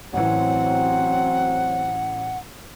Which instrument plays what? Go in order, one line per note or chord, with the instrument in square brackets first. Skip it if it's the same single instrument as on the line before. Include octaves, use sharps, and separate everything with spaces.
[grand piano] A1 E3 [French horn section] F#3 C4 [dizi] F#5